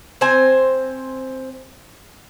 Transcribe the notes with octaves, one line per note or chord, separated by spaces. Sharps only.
C4 C5 G#5